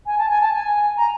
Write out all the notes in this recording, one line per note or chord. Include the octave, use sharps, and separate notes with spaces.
G#5
A5
G#5
A5
G#5
A#5